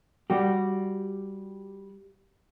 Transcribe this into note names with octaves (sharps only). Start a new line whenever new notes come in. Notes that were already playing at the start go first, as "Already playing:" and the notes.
G3 F#4 G4